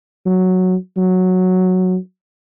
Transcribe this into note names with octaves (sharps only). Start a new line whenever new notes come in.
F#3
F#3